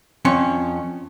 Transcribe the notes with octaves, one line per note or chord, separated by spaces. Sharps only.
F2 C#4 C#5